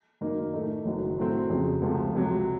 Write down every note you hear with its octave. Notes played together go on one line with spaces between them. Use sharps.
F#2 D#3 A#3 D#4 A#4
A2 A3 D#4
F#1 F#2 D#3 F#3
A2 F#3 A3 C4
F2 C#3 F#3
C#2 C3 F3 A3
C#2 C3 F#3